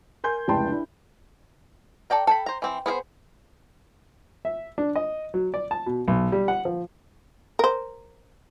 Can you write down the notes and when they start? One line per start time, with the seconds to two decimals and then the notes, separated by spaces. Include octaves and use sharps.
0.24 A#4 G#5 C6 G6
0.48 F1 C#2 E4 G5 A5 C6
0.68 D4 E4
2.10 A4 D5 G5 A#5
2.27 A4 G5 B5
2.46 C5 A#5
2.62 E3 C4
2.86 B3 G#4 A#4 C5
4.45 E5
4.78 D4
4.96 D#5
5.34 F#3
5.54 D5
5.71 A5
5.86 B2
6.08 B1
6.32 G3
6.48 F#5
6.65 F3
7.59 A#4 C5